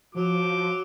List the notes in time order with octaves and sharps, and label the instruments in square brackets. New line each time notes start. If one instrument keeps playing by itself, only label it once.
[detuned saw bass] F3 [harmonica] F#3 [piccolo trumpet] D6